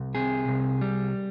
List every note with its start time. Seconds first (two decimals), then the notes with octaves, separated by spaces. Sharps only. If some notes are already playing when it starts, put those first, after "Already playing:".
Already playing: C2
0.15 C3 G#4
0.48 C2
0.81 G3